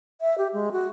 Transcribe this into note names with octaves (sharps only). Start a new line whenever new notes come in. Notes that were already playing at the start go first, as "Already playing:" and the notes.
E5
G4
G#3
F#4